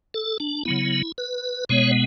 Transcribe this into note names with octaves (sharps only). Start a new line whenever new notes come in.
A4
D4
C#3 F#3 B3 E4
B4
B2 G#3 B3 C#5